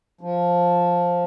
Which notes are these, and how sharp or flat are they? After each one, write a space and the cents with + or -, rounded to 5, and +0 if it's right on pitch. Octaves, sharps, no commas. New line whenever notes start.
F3 +5